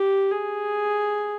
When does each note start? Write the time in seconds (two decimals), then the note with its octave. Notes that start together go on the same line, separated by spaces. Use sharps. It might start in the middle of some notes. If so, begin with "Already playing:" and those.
Already playing: G4
0.31 G#4